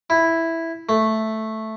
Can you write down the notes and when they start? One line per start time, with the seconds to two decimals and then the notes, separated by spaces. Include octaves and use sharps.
0.10 E4
0.89 A3